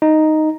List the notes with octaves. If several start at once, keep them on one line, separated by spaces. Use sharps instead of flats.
D#4